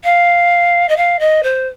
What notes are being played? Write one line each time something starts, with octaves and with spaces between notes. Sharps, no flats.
F5
D#5
F5
D#5
C5